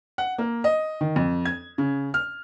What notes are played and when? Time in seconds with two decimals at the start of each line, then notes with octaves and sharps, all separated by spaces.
0.18 F#5
0.38 A#3
0.64 D#5
1.01 D#3
1.16 F2
1.45 G#6
1.78 C#3
2.14 F6